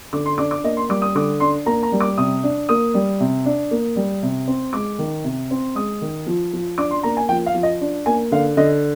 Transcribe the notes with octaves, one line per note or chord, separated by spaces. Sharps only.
D3 D6
C6
D4 D6
D6
A#3 D#5
C6
G3 D6
D#6
D3 D6
D4 C6
A#3 A#5
A#5
G3
D6
C3 D#6
D4
A#3 D#6
G3
C3
D4
A#3
G3
C3
C4
G#3 D6
D#3
C3
C4
G#3 D#6
D#3
F3
F3
D4 D6
C6
A#3 A#5
G#5
F3 G5
F5
F3
D#5
D4
A#3 G#5
D3 F5
D3 D#5